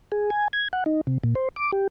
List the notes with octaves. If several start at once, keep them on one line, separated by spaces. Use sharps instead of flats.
G#4
G#5
G#6
F#5
D#4
C3
A#2
C5
D6
G4